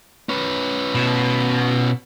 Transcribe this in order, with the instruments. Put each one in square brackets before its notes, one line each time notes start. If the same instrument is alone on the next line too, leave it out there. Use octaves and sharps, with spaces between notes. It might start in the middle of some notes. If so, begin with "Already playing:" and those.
[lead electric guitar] C#4 B4
[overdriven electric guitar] B2